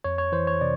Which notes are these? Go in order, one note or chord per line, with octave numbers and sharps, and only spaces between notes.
F2 C#5
C#5
E3 C5
C#5
C3 D5